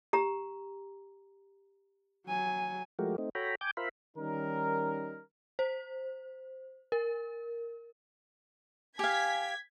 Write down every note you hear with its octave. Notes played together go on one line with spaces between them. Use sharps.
G4 A#5
F#3 G#5
F3 G#3 A3 F#4 G4 A#4
A3 C4 D#4
F#4 A4 C#5 G5 A#5 B5
G5 G#5 D6 G6
F4 A#4 C5 E5 F5 B5
D#3 G3 C#4 D#4 A#4
C5
A#4
G4 F5 G#5 G#6 B6